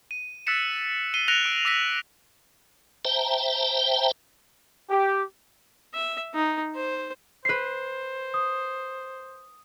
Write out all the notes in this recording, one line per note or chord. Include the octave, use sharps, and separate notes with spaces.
D#7
E6 F#6 A6 B6 C#7 E7
B6 C7 D#7 G7
F#6 A#6 C#7 D7 F7 G7
E6 D7
D6 E6 A#6 B6 F7
C5 E5 G5 A5 A#5
G4
E5
D#4
C5
B4 C5 C7
D#6